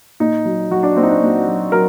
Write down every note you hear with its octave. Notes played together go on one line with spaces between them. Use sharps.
A#2 D#4
F#3
F#3 F#4
D4
A#2 C4
D#4
D4
A#2
F#3
F#3 A#4